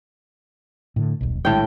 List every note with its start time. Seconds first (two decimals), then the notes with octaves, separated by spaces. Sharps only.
0.96 A2 D3
1.21 D#1 B1
1.45 A#1 A2 D#3 G#3 G5